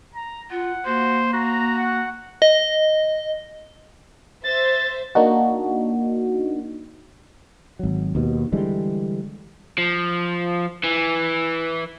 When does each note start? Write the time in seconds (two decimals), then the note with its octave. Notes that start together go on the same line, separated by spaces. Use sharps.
0.15 A#5
0.51 F4 F#5
0.86 A#3 F#4 C5
1.33 F#4 A#5
1.78 F#5
2.42 D#5
4.44 C5 E5 A6
5.15 A#3 D4 D#4 F#4
7.79 G#1 F#3
8.15 D#2 B2
8.52 D3 E3 G3 G#3
9.78 F3
10.83 E3